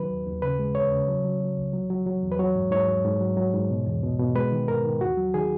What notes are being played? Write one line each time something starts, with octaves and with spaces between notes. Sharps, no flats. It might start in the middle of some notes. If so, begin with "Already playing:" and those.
Already playing: D#3 F#3 B4
D#2
D#2
C#3 B4
G#3
E2 C#5
C#3
F#3
F#3
F#3
C#2
F#3
F#3
F#3
E2
B4
F#3 C#5
G#2
G#2 C#5
F#3
G#2
F#3
F#3
G#2
B2
E2
B2
B2
G#3 B4
D#3
G#2 A#4
D#3
D#2 F#4
F#3
D#3 G#4